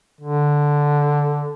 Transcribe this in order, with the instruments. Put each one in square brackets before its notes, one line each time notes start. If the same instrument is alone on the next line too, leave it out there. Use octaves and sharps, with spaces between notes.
[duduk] D3